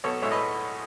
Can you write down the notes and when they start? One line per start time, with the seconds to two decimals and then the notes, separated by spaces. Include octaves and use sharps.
0.04 B1 A4 C#5
0.22 A2 G#3 C#5 E5
0.31 B4 D#5